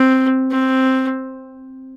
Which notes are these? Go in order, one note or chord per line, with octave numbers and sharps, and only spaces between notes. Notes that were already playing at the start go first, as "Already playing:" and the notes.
Already playing: C4
C4